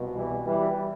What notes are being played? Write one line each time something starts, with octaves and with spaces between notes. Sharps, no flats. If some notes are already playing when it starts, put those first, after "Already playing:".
Already playing: C2 B2
E3 G3
E3 G3